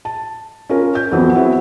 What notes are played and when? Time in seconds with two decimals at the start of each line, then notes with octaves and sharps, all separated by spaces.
0.05 A5
0.69 C#4 F4 A#4
0.95 G6
1.11 F2 E3 F#3 B3 C4 F4
1.35 B3 C4 E4 F#4 G#4